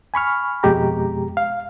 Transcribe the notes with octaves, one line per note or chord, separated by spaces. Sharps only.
G#5 B5 C#6 F6
F2 B2 G#3 G4 A#5
F5